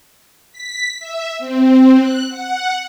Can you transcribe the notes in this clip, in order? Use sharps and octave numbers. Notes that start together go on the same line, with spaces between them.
B6
E5
C4
F#6
F#5